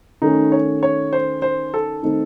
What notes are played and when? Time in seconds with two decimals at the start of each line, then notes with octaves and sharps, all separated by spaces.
0.22 D#3 A3 C#4 D#4
0.52 C#5
0.83 C#5
1.13 C5
1.42 C5
1.74 A4
2.03 D#3 A3 C4 D#4